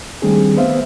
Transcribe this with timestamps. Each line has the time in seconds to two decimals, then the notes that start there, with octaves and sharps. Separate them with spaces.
0.22 D#3 G3 A3 C4 D4 G#4
0.57 B3 C5 E5 F5